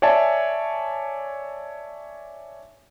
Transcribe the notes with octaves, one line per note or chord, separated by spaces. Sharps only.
C#5 D5 E5 G#5 A5